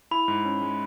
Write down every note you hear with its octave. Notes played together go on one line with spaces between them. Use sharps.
E4 B5
G#2
C#4
G#3